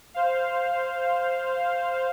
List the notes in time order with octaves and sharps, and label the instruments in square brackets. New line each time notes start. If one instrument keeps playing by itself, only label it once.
[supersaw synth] C5 F5